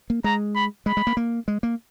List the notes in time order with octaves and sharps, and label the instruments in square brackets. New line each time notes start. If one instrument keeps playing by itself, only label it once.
[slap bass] A#3
[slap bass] G#3 [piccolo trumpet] A#5
[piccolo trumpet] B5
[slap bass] G#3 [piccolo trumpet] B5
[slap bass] G#3
A#3
A#3
G#3
A#3